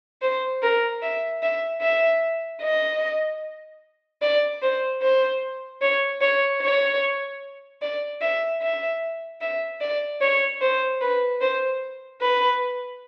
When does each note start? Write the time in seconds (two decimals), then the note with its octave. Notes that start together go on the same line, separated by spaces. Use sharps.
0.22 C5
0.62 A#4
1.02 E5
1.42 E5
1.82 E5
2.62 D#5
4.22 D5
4.62 C5
5.01 C5
5.82 C#5
6.21 C#5
6.61 C#5
7.82 D5
8.21 E5
8.62 E5
9.41 E5
9.81 D5
10.21 C#5
10.61 C5
11.01 B4
11.41 C5
12.21 B4